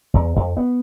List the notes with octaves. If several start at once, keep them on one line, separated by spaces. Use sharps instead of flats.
E2
F2
B3